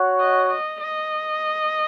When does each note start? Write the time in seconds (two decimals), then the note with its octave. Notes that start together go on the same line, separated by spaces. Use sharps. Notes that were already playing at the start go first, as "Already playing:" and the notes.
Already playing: F#4 C#5 F#5
0.20 D#5
0.50 D#5
0.81 D#5